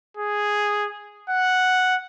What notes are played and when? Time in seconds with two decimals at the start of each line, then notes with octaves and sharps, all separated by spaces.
0.17 G#4
1.30 F#5